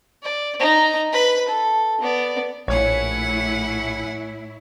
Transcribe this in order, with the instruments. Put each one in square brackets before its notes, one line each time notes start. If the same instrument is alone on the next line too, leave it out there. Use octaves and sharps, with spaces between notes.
[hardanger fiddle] D5
D#4 A#5
B4 B5
A4
B3 D5
[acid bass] A#1 [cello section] A2 E4 [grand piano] C#5 [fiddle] F#5 G#5